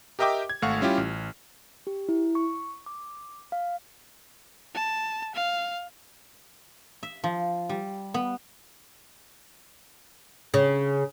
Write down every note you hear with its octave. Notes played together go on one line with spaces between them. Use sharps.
G4 A#4 D#5 E5 G5 D6
G#6
G#1 A3 F5 F#5 C#6 F6
G3 C#4 E4 F4 G4
A1
G4
E4
C#6
D6
F5
A5
F5
E5
F3
G3
B3
C#3